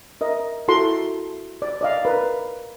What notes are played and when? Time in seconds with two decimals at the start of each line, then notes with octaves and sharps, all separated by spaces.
0.21 A#4 D#5 E5
0.68 E4 F#4 A4 A#5 C6
1.62 D5
1.81 D5 D#5 F5
2.05 A#4 B4